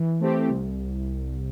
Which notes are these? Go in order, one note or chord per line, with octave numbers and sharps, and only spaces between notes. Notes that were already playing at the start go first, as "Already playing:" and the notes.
Already playing: E3
A3 C4 G4
C2